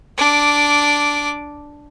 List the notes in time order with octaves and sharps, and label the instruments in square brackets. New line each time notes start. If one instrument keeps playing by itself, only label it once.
[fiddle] D4 D6